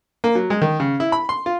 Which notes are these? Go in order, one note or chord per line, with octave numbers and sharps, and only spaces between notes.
A#3
F#3
G#3
D#3
C#3
E4
B5
C6
F4